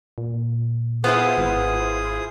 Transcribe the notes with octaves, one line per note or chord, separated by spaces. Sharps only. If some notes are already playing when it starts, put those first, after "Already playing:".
A#2
B3 E4 F4 G#4 C5 D#6
G#1